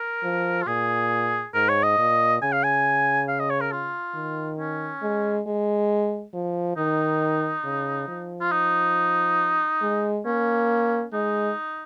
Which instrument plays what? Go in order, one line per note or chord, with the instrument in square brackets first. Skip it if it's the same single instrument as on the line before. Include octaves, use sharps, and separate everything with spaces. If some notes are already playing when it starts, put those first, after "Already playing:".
Already playing: [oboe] A#4
[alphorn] F3
[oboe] F4
[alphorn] A#2 [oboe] G#4
[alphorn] G#2 [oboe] A#4
[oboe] C#5
D#5
[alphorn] A#2
[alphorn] C#3 [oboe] G#5
[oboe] F5
G#5
F5
D#5
C#5
A#4
F4
[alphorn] D#3
[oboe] C#4
[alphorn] G#3
G#3
F3
[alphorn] D#3 [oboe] D#4
[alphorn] C#3
F3
[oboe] F4
D#4
[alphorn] G#3
[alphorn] A#3 [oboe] C#4
[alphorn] G#3 [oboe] D#4